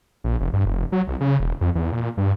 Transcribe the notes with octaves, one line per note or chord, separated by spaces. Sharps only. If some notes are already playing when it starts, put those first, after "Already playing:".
A#1
F1
G2
F1
F#3
C2
C#3
E1
F2
E2
A#2
G2